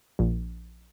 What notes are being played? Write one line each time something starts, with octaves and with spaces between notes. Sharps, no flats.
A#1